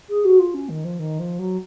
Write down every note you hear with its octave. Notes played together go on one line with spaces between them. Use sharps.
G#4
F#4
F4
C#4
D#3
F3
D#3
F3
F#3